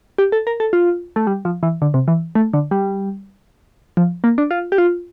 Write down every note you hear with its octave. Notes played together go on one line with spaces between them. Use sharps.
G4
A4
A#4
A4
F4
A3
G3
F3
E3
D3
C3
E3
A3
D3
G3
F3
A#3
D4
F4
G4
F4